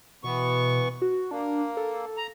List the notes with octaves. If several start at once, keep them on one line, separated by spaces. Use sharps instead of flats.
B2 E3 B3 C#6
F#4
A#3 D4
A4
A#5